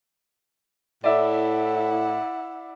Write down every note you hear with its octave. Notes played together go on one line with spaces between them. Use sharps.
A2 E4 D5 E5 F#5